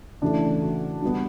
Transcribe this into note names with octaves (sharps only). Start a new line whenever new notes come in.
C#3 E3 A3 D4
F#4
D3 G3 B3